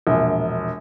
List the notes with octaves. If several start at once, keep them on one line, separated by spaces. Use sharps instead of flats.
E1 A#1